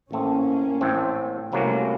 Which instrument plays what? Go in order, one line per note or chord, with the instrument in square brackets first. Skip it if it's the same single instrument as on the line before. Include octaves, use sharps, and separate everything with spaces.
[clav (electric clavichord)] A1 A2 A3 C4 [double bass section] A#3 C#4
[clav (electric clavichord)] A1 A2 A3 C4
[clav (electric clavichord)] C2 C3 F#3 A#3 C#4 [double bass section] A3 C4